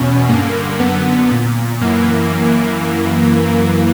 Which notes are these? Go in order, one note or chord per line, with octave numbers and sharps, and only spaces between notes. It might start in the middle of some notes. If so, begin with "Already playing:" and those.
Already playing: E2 B2 C#4
G2 D3 A#3
F#2 D3 B3
A#2
F#2 E3 A#3